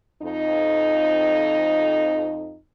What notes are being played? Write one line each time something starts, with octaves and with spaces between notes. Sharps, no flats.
F2 D#4